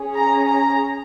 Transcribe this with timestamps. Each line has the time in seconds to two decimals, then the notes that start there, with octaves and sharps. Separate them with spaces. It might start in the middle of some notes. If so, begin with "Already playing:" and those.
Already playing: C#4 G#4
0.15 A#5
0.47 A#5